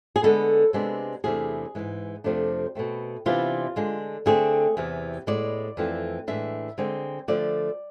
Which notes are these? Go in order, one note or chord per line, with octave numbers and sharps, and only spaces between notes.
G#4
D3 G#3 B3 A4
C3 G#3 B3 D4
E2 C3 E3 A3 D4 G#4
G#2 E3 G#3
F2 C3 F3 A3 D4
B2 A3 C4
C3 E3 B3 D4 F4
D3 G#3 D4
D3 A3 C4 G#4
E2 C3 E3
A2 G#3 B3 D5
F2 E3 A3 C4
A2 E3 G#3 D4 E5
D3 G#3 C4
D3 F3 A3 D5